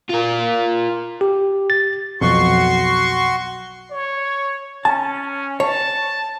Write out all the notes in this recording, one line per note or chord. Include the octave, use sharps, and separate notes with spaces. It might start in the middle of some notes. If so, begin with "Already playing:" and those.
F4 A#4
G4
A6
B1 F2 F#4 C6 C#6
C#5
C#4 A5
C#5 A5